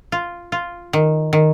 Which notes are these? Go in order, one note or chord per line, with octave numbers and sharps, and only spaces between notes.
F4
F4
D#3
D#3